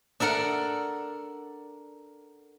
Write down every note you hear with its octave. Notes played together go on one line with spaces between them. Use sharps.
D4 A4 A#4 F#5